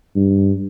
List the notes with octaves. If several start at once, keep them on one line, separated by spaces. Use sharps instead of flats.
G2